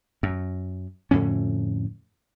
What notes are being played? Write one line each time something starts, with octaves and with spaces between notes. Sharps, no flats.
F#2
F2 A2 D3 C#4